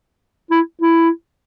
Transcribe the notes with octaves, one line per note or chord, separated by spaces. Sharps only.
E4
E4